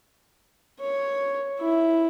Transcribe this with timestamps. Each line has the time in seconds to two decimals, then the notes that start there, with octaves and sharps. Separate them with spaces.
0.80 C#5
1.60 E4